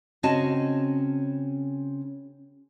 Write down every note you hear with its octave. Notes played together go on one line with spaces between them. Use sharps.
C#3 C4 C#4 F#4 D#5 A5